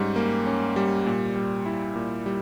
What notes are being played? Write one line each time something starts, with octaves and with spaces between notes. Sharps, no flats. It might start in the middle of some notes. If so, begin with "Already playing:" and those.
Already playing: G#2 G3 C#4
A#3
C#4
G3
A#2
G3
E4
A#2
G3